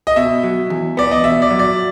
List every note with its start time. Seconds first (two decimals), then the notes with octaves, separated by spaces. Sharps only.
0.07 D#5
0.16 B2 E5
0.43 F#3
0.70 E2
0.97 B3 D5
1.11 D#5
1.24 B2 E5
1.42 D5
1.51 F#3
1.59 D5